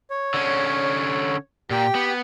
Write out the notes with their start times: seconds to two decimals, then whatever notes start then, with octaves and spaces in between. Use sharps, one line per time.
0.10 C#5
0.34 D3 C#4
1.70 A#2 G4 G5
1.95 B3